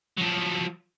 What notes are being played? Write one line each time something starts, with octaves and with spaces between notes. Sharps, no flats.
F3 F#3